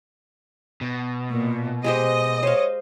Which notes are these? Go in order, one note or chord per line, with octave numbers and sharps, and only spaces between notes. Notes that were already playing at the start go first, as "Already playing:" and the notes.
B2
A#2
G#3 G4 C5 D#5
C5 C#5 F5